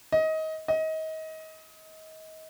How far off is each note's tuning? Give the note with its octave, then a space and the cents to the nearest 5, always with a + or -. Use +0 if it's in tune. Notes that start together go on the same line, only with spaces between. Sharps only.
D#5 +25
D#5 +30